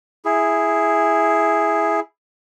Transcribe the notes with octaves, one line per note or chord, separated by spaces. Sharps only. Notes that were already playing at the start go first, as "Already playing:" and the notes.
E4 G#4